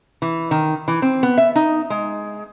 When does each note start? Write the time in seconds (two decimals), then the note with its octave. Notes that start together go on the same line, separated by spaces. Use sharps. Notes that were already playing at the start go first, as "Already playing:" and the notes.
0.22 E3
0.51 D#3
0.88 E3
1.02 C4
1.23 B3
1.38 E5
1.56 D#4
1.90 G#3